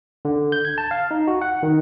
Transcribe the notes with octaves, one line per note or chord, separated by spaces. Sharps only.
D3
G6
G#6
A5
F5
D#4
F#4
F#5
D#3